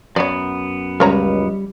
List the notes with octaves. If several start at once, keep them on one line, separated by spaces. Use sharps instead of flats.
F#2 B3 C#5 D5
C#2 G3 A#4 C#5 A#5